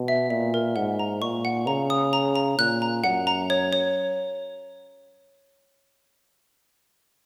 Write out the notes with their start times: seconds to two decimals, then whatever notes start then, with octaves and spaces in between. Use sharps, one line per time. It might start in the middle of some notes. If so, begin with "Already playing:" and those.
Already playing: B2
0.08 E5
0.30 A#2 E5
0.54 A#4
0.76 G#2 F#5
0.99 A#5
1.22 A#2 C#6
1.45 F#5
1.67 C#3 A#5
1.90 D#6
2.13 A#5
2.36 A#5
2.58 A#2 F#6
2.82 A#5
3.04 F#2 F#5
3.27 A#5
3.50 C#5
3.73 C#5